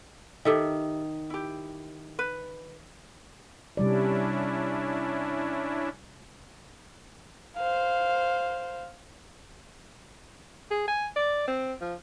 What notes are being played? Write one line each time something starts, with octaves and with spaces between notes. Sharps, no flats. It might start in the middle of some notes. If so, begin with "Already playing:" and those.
D#3 G4 A4 E5
E4 G4
B4
C3 G3 C#4 D4 E4 D5
C5 F5
G#4
G#5
D5
C4
F3